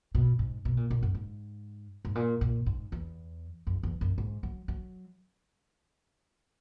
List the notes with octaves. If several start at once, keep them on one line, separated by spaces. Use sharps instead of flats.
B2
G#2
B2
A#2
A#2
F#2
G#2
G#2
A#2
A#2
G#2
E2
F#2
E2
F#2
G#2
F#3
F#3